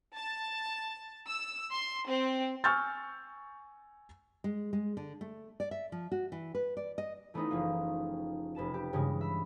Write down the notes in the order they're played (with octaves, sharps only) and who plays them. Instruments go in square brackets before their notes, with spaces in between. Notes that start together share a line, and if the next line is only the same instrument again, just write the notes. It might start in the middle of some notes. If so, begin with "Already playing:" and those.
[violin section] A5
E6
C6
C4
[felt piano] G#5 C#6 E6 F6 G6 A6
[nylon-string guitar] G#3
G#3
D3
A3
D5
E5
F3
F#4
E3
B4
D5
D#5
[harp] E3 A3 B3 C#4 D#4 E4
F#1 F3 C#4 F4
F1 B4 A5 E7
G4
G2 C#3 E3 G#3
E5 B5